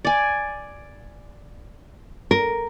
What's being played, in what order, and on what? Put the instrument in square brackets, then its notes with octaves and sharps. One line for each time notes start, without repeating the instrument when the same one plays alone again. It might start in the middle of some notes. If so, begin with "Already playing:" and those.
[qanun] D5 G#5
[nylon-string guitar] A#4